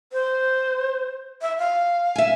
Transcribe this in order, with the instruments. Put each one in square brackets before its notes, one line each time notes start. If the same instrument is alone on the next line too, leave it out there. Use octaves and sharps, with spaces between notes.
[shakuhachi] C5
E5
F5
[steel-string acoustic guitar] E5 G#5